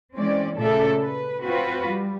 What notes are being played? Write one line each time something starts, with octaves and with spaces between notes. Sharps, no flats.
E3 G#3 C4 C#4 D5
A#2 C#3 A3 A4 D5 E5
B4
C4 F4 F#4 B4
G3